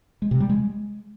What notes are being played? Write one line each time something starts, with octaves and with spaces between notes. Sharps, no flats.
G#3
C3
G3
G#3